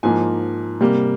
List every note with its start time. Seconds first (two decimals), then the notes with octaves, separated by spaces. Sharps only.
0.03 G#2 F3 A#3 G#5
0.81 C3 G3 A#3